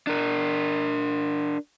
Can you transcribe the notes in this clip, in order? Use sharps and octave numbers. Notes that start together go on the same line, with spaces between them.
D4 A#4